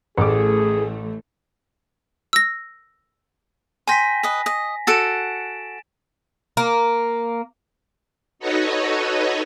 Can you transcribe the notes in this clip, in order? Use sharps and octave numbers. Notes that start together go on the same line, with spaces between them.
A1 E3 A3 G#4 D6
E6 A#6
G5 G#5 C6 A#6 B6
B4 D#5
D#5
F#4 A4 F#5 A6 D7 E7
A#3
D#4 F#4 A4 B4 C#5 D#5